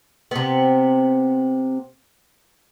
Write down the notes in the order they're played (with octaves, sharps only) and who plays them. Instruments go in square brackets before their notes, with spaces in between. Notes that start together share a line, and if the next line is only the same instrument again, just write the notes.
[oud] C3 B3